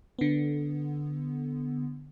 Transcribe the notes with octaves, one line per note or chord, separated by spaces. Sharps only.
D3 B3